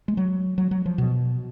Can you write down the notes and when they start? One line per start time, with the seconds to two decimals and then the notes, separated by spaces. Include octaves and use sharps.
0.08 G#3
0.17 F#3
0.58 F#3
0.71 F#3
0.86 F3
0.98 B2